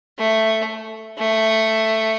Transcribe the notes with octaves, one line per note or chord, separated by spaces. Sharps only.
A3
A3